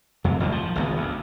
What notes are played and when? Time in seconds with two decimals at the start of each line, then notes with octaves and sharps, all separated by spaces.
0.24 F2 C3
0.40 A1 E2 D#3 E3
0.52 F3
0.76 G#1 C#2 B3
0.97 D2